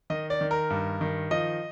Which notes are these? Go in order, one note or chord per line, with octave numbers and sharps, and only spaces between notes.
D#3 D#5
D5
D#3
A#4
G2
D#3
F3 D#5